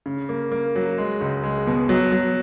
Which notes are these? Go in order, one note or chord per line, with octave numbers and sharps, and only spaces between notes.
C#3
A#3
A#3
F#3
G#3
C#2
G#3
B2
F#3
F#3